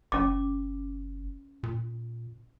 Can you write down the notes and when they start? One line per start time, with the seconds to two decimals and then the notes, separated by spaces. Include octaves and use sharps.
0.12 F#1 C#4 D6
1.63 A#2